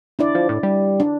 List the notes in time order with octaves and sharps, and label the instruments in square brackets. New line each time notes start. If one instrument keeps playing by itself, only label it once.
[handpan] D4 E4 D5
[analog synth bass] F3
A2
G3
[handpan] D4